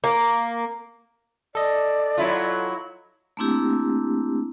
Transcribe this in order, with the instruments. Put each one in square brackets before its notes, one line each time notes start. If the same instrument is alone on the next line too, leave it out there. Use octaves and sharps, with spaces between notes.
[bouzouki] A#3
[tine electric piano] A4 D#5 [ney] D5
[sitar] F#3 E4 F4
[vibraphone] A3 A#3 C4 D4 E4 G4